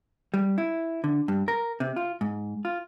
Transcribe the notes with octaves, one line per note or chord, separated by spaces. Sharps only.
G3
E4
D3
G2
A#4
C3
F4
G#2
F4